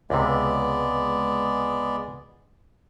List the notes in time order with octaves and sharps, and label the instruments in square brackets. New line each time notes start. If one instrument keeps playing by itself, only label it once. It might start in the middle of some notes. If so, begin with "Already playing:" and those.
[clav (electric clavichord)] C#2 C3 [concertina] G#3 B3 D5